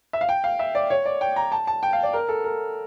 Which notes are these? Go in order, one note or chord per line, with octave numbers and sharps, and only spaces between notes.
E5
F5
G5
F5
E5
D5
C#5
D5
G5
A#5
A5
A5
G5
F5
D5
A#4
A4
A#4